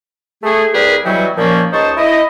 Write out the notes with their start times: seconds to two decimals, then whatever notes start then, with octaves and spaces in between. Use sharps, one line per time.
0.43 A3 G#4
0.74 C2 G3 G4 G#4 A#4 B4
1.05 B2 E3 F#3 G3 F#4 G4
1.37 D#2 A#2 F3 A#3 C#4
1.73 C#2 D#4 C5 A5 C#6 D#6
1.97 E4 D#5